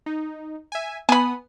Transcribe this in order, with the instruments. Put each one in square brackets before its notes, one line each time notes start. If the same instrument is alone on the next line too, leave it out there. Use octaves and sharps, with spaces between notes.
[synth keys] D#4
E5 G#5
[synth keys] B3 D#6 [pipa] G#5 B5